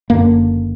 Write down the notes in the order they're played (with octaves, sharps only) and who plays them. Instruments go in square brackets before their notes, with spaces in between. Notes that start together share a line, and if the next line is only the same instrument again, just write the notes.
[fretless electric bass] F#1 F#2 D3 A#3